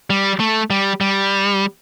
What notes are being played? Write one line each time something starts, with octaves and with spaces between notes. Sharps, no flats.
G3
A3
G3
G3